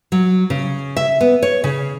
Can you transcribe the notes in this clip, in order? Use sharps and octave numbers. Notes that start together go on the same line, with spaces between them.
F#3
C#3
E5
B3
C#5
C#3